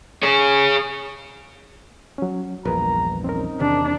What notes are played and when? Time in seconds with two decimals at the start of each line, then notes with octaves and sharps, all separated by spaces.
0.23 G#4 C#5
2.18 F#3 C#4
2.65 A#1 E2 G2 A#4 B4 A#5
3.24 C4 C#4 D#4 A#4
3.60 E2 C3 D#3 D4